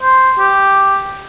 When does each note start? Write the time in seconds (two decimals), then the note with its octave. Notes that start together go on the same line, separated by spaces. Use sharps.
0.03 C5
0.39 G4